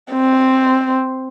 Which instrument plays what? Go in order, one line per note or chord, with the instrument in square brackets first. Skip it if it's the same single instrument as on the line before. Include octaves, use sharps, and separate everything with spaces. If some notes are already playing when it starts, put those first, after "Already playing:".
[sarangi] C4